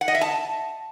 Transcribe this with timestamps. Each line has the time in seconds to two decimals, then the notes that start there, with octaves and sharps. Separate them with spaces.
0.01 F#5
0.08 D#5
0.15 E5
0.21 A5